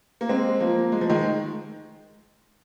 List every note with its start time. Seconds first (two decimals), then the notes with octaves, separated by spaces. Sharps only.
0.21 A#3
0.29 G#3 C4
0.60 F3 A#3
0.92 G#3
1.01 F3
1.09 D#3 G#3